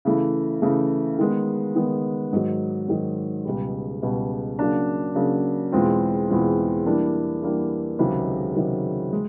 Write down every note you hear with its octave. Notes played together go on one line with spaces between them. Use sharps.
C#3 E3 A3
C#3 E3 A3
D#3 G#3 B3
D#3 G#3 B3
G#2 D#3 F#3
G#2 D#3 F#3
C#2 B2 G3
C#2 B2 G3
C#3 F#3 A#3 D4
C#3 F#3 A#3 D4
E2 B2 G#3 C4 F4
E2 B2 G#3 C4 F4
E3 G3 A#3 D4
E3 G3 A#3 D4
C#2 C3 D#3 F#3
C#2 C3 D#3 F#3
G#3